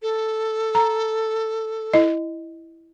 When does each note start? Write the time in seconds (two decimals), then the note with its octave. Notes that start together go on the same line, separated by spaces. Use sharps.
0.02 A4
0.75 A#5
1.93 E4 D#5